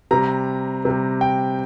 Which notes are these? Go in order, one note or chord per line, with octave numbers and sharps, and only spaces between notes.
C3 G3 A#5
C3 G3
G5